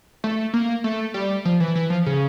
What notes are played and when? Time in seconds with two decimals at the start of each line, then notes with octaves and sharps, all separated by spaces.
0.24 A3
0.54 A#3
0.84 A3
1.14 G3
1.45 F3
1.60 E3
1.75 E3
1.90 F3
2.06 C#3